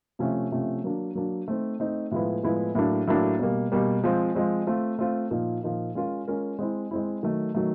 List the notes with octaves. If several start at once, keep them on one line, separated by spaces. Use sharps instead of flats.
C3 F3 A3 C#4
C3 F3 A3 C#4
F#3 A#3 D4
F#3 A#3 D4
A3 C4 D#4
A3 C4 D#4
A2 F3 G#3 B3 E4
A2 F3 G#3 B3 E4
A2 F#3 A#3 D4
A2 F#3 A#3 D4
B2 G3 A#3
B2 G3 A#3
F3 G#3 C4
F3 G#3 C4
A3 C4 F4
A3 C4 F4
A#2 F3 A#3 D#4
A#2 F3 A#3 D#4
G#3 C#4 F4 A#4
G#3 C#4 F4 A#4
G#3 C4 E4
G#3 C4 E4
D#3 F#3 A3
D#3 F#3 A3